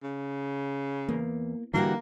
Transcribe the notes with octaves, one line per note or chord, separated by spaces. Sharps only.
C#3
E2 A#3
D3 E3 G3 A#3 F#4 G4